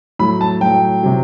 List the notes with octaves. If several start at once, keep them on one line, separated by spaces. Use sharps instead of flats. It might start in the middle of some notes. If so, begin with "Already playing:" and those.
A2 F#3 B5
A5
A2 F#3 G5
C3 F#3